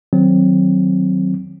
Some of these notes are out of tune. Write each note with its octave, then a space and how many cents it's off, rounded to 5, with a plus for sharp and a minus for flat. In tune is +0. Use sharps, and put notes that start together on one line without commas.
D#3 +0 F#3 +0 C4 +0